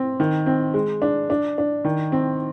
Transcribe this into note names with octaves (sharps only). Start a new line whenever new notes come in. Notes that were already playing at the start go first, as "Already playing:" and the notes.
Already playing: C4
D#3
C4
G#3
D4
D4
D4
D#3
C4